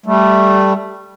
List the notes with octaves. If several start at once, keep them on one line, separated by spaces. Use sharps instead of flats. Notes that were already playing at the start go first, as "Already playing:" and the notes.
G3 A3